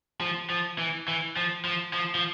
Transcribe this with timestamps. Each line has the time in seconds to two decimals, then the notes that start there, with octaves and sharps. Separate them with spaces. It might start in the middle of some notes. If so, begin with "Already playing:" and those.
0.21 F3
0.50 F3
0.78 E3
1.08 E3
1.36 F3
1.65 F3
1.93 F3
2.15 F3